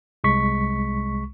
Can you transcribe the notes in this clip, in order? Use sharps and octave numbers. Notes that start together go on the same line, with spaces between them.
C2 G#3 C#6 B6